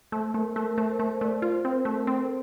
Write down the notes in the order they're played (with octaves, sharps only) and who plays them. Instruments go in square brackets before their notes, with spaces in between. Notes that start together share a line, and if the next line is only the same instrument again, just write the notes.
[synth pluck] A3 [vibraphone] C5
[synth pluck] A3 [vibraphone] A#4
[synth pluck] A3 [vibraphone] A#4
[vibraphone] A#4
[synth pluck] A3 [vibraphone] C5
[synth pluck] A3 [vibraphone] C5
[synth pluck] A3 [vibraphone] D5
[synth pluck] F4 [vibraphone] C5
[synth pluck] C4
[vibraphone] A#4
[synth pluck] A3
[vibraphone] A4
[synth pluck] C4